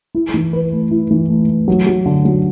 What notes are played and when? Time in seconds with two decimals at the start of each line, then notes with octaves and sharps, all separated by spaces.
0.15 E4
0.34 E3
0.53 B4
0.72 A3
0.91 E4
1.11 E3
1.29 A3
1.49 A3
1.68 F#3
1.87 F#3
2.06 D3
2.25 F#3